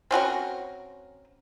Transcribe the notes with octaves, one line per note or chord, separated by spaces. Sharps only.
C4 C#4 F#4 A#4